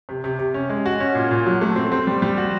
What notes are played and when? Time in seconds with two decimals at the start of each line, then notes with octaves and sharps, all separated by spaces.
0.09 C3
0.24 C3
0.39 C3
0.54 C#4
0.70 G#3
0.86 F#4
1.00 C#4
1.15 A#2
1.31 A#2
1.46 F#3
1.61 A3
1.76 C4
1.92 C4
2.07 G3
2.22 G3
2.37 F#4